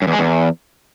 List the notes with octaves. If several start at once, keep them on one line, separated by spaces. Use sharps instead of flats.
F#2
E2
G#3
E2